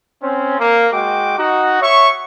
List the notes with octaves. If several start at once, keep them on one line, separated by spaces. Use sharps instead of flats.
C4 C#4
A#3
G#3 F#4 G5 D6
D#4 F#4
C#5 E5 C#6